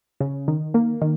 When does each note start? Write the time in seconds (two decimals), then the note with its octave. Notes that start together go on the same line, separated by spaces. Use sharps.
0.20 C#3
0.48 D#3
0.74 A#3
1.02 D#3